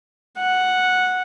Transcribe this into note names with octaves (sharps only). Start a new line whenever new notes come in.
F#5